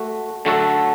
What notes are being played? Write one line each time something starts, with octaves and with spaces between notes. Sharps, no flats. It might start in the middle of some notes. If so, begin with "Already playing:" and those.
Already playing: A3 F#4
D3 F#3 A3 F#4 A4